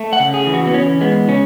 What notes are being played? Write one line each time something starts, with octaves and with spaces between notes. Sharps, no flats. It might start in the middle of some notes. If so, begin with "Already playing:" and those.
Already playing: A3
F#5
C#3
G#4
E3
F#4
B3
E3 C#4
G#3 B3
C#3 C#4